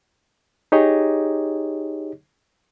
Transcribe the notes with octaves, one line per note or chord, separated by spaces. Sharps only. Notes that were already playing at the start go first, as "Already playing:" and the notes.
D#4 G4 G#4 C#5 D#5